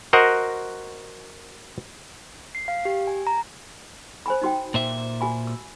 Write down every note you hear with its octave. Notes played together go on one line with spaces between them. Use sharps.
F#4 A#4 C5 D#5 F#5
C7
F5
G4
G#5
A#5
C5 G#5 B5
D#4 F#4 G5
A#2 C5 E5
F#4 G#5 B5
E6